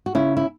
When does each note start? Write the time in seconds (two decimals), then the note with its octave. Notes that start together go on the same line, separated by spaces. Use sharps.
0.06 F#4
0.15 C#3 C#4 E4
0.37 E4